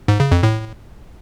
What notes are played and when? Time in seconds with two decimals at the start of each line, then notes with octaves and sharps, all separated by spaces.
0.08 G#2
0.20 C#3
0.32 F2
0.43 A2